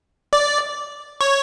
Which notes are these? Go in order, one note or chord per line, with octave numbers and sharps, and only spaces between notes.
D5
C#5